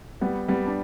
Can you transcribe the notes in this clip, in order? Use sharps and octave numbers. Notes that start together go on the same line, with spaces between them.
G3 B3
G3 B3
D4